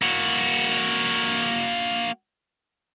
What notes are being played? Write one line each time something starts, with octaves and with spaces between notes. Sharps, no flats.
A#3 F#4